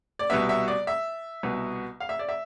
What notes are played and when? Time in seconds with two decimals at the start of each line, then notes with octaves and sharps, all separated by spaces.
0.19 D5
0.30 C2 B2 G3 B3 E5
0.49 E5
0.68 D5
0.87 E5
1.43 C2 B2 B3
2.00 F5
2.09 E5
2.19 D5
2.29 E5